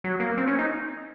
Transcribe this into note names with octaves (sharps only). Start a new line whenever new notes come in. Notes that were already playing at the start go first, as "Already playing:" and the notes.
F#3
A#3
C4
C#4
D#4